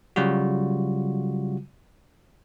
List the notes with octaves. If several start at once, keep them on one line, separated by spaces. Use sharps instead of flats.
C#3 F#3 G3 F4 F#4